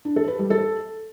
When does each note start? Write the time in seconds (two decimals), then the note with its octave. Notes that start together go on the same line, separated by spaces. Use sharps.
0.05 D4
0.16 A4
0.28 B4
0.39 G3
0.50 A4